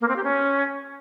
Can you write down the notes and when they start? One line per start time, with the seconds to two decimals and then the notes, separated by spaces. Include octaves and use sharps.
0.01 A#3
0.08 C4
0.16 G4
0.24 C#4